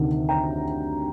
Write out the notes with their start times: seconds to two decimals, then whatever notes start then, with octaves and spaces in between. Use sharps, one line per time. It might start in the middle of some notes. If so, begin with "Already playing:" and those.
Already playing: D2 C3 D#3
0.29 G5 A#5